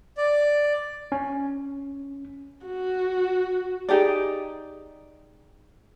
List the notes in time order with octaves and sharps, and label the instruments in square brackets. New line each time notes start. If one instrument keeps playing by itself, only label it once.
[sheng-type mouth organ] D5
[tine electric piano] C#4
[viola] F#4
[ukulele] D#4 G4 G#4 D5